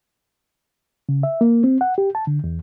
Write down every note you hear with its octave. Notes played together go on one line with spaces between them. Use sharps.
C#3
E5
A#3
C4
F#5
G4
A5
D3
E2